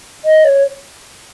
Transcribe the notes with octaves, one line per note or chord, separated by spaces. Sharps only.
D#5
C#5